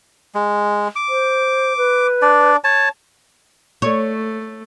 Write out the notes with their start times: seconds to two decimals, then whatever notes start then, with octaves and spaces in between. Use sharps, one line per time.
0.35 G#3
0.96 D6
1.09 C5
1.77 B4
2.22 D4 D5
2.64 C#5 A5
3.82 A3 C#5